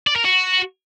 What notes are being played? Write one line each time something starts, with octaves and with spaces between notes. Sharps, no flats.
D5
A#4
F#4